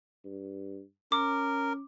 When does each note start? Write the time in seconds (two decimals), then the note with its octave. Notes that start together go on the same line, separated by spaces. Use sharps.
0.25 G2
1.12 C#4 A#4 D6